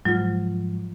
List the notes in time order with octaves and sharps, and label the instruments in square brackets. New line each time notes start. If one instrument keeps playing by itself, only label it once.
[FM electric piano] G#2 F3 [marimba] F#3 F4